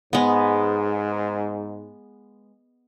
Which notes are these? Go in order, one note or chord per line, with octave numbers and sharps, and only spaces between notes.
G#2 G#3 B3